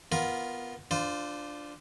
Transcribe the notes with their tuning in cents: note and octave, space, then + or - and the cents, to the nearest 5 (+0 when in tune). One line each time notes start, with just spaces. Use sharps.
B3 +0 F4 +0 A#4 +15
D4 +0 F4 +0 C5 -30